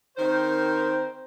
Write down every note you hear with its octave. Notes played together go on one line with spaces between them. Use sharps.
D#3 C4 A#4 C5